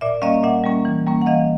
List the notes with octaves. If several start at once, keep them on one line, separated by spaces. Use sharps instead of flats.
A#2 D5 E5
G3 A#3 C#4 D#5 F5
A#2 E5 F#5
G3 A#3 C#4
E3
G3 A#3 C#4
F#5
E3 D#5 F5